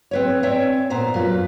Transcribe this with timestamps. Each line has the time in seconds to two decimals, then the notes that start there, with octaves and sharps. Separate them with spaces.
0.11 C4 B4 C#5
0.43 C4 C#5 D5 E5 G#5
0.90 A#2 B3 C5 A#5
1.14 F#2 F4 B4